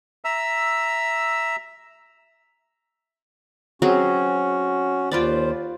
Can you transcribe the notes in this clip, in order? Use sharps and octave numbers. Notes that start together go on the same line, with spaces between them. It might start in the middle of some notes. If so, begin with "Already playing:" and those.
E5 A#5 E6
F#3 C4 C#4 F#4 G#4
D#2 F4 B4 C5 D5